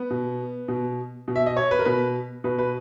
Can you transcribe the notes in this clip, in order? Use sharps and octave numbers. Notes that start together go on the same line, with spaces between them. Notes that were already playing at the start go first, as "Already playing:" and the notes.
Already playing: B3
B2
B2
B2
E5
D#5
C#5
B4
A#4
B2 B4
B2 B4
B4